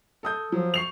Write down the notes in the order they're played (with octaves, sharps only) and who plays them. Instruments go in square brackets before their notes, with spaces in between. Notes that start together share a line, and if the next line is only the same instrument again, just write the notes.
[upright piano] A4 D#6 G6
[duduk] F3 [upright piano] F#3
[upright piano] C#6 C7 F7